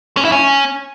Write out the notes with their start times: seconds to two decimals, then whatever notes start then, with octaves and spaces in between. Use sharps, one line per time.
0.17 C#4
0.25 E4
0.32 C#4